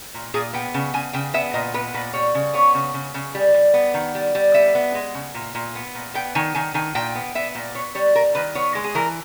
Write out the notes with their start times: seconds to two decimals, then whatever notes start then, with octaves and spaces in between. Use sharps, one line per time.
0.14 A#2
0.34 A#2 G#4
0.53 B3 G5
0.74 C#3
0.94 C#3 G#5
1.13 C#3 G5
1.34 B3 E5
1.54 A#2 D#5
1.74 B3 B4
1.94 A#2 B4
2.13 G3 C#5
2.35 C#3
2.53 B3 C#5
2.74 C#3
2.94 C#3
3.14 C#3
3.35 G3
3.54 G3
3.74 B3
3.94 D#3
4.15 G3
4.35 G3
4.54 B3 E5
4.75 B3
4.95 G#3
5.14 C#3
5.34 A#2
5.55 A#2
5.75 B3
5.95 A#2
6.14 B3 G5
6.35 D#3 G#5
6.55 D#3 G#5
6.74 D#3 G#5
6.95 A#2 G5
7.15 B3
7.35 B3 E5
7.55 A#2
7.75 B3 C#5
7.95 G3 C#5
8.15 G3 A#4
8.35 D#3 B4
8.55 B3 C#5
8.75 G#3
8.84 G#4
8.95 E3 A#4